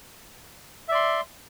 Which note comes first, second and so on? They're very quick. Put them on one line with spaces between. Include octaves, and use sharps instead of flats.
E5 D5 C6